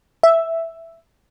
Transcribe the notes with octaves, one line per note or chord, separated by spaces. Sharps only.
E5